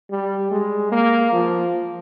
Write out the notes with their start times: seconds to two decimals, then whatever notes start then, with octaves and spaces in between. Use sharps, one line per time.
0.10 G3
0.51 G#3
0.92 A#3
1.32 F3